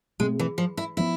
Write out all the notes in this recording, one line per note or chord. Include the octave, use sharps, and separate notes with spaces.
B2 G#3 A3 C4
E3
F3
E4
F3 B3 E4